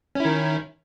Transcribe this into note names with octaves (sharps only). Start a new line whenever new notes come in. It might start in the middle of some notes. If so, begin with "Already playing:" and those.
D#3 C#4 E4